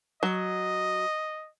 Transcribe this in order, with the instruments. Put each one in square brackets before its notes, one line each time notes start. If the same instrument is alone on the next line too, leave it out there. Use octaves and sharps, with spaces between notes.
[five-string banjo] F#3 [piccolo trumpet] D#5